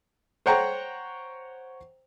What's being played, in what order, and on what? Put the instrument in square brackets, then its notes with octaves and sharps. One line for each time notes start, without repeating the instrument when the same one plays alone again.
[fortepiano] C5 C#5 F#5 G5 A#5 C#6